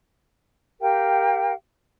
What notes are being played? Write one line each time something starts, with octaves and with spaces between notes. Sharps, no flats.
G4 A#4 F5 G5